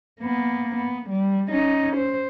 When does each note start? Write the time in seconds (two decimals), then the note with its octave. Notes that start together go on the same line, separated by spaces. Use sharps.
0.21 A#3 B3
0.76 B3
1.09 G3
1.51 C#4 D#4
1.96 C5